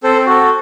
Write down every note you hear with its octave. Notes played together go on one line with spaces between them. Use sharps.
C4 A4 C5
F#4 A4